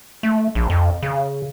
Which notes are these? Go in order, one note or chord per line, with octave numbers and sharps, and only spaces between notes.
A3
A#1
F2
C#3